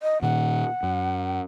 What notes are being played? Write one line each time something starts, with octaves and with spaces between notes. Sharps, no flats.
D#5
A#2 D#3 F#5
F#2